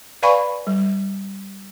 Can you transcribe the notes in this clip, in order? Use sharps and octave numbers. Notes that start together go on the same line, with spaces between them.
B4 D5 F5 G#5 B5 C#6
G3